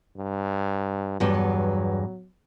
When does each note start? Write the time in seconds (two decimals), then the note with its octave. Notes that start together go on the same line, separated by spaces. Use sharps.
0.17 G2
1.20 E2 G2 F#3 B3